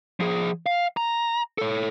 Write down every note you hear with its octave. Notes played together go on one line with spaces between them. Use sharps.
F3 G#4
F5
A#5
A4 C#5